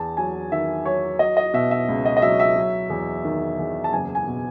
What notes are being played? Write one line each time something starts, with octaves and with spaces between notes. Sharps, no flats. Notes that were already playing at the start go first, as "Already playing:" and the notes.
Already playing: E2 A5
F#3 G#5
D#3 E5
F#3 C#5
F#3 D#5
D#5
B2 E5
E5
C#2
D#5
D#5
F#3 E5
E5
F#3
E2
D#3
E2
A5
F#1 G#5
G#5
B2